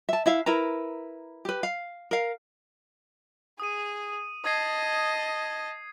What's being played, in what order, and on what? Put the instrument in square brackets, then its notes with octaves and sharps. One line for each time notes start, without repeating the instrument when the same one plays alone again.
[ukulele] E5 A5
E4 E5 F5
E4 A#4 B4 A#5
G4 B4
F5
A#4 F5
[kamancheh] G#4 [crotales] D#6 D#7
[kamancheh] D#5 A5 [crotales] D#6 G#6 C7